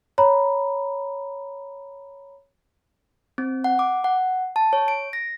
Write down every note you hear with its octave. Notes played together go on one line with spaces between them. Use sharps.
C#5 A#5 B5
C4
F#5
D6
F#5
A5
C#5
D7
A#6